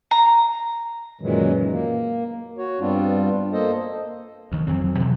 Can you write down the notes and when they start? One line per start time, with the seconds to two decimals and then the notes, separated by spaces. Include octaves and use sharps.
0.11 A#5
1.21 F#2 A#2 D#3 E3 F#3 G#3
1.71 A#3
2.58 F#4 C#5
2.80 G2 G3 B3 C4 D4 F4
3.53 A#3 A4 C5 D#5
4.52 D2 D#3
4.67 F2 F#3 C4
5.00 B2 E3 F#3